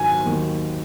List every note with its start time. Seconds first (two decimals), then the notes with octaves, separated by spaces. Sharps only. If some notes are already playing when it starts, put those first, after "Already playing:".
Already playing: G#2 D#3 F#3 G#5
0.25 D#2 D#3 F#3